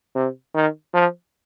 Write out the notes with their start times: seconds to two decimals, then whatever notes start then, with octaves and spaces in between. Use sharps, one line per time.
0.15 C3
0.55 D#3
0.94 F3